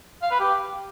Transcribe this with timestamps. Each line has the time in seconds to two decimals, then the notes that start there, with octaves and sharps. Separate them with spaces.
0.22 F5
0.31 B4
0.40 G4